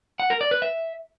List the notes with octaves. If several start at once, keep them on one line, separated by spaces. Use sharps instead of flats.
F#5
A#4
D5
B4
E5